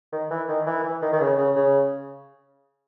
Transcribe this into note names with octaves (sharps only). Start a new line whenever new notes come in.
D#3
E3
D#3
E3
E3
D#3
D#3
C#3
C#3
C#3